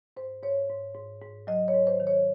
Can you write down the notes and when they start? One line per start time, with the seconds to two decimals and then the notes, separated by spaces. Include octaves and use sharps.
0.17 G#2 C5
0.42 G#2 C#5
0.70 G#2
0.95 G#2
1.22 G#2
1.47 F#3 D#5
1.68 C#5
1.74 G#2
1.87 C5
2.00 D#3
2.07 C#5